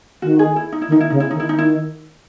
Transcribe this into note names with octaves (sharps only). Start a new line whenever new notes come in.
D#3 F#4
G#4
E4
D#4
E4
D#3
D#4
E4
C#3 D#4
E4
D#3 D#4
E4
D#4
D#3 E4